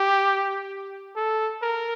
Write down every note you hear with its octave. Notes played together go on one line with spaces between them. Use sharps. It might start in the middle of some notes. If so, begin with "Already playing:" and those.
Already playing: G4
A4
A#4